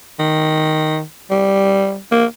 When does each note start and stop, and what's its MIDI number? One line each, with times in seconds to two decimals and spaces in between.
0.19 1.02 51
1.31 1.98 55
2.12 2.25 58